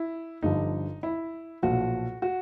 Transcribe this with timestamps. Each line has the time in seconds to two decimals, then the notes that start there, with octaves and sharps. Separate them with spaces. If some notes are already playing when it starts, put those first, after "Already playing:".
Already playing: E4
0.43 G1 G2 D3 F3 D#4
1.03 E4
1.62 B1 A#2 F3 F#4
2.22 F#4